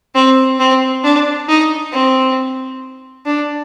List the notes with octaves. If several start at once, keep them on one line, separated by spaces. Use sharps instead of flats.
C4
C4
D4
D#4
C4
D4